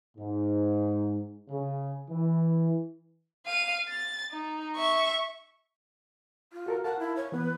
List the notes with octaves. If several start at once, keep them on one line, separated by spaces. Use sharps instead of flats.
G#2
C#3
E3
F5 D#7
A6
D#4
E5 C#6
F4
F#4 A4 A#4
A#4 F5 F#5 A5
E4
C#5
E3 B3 B4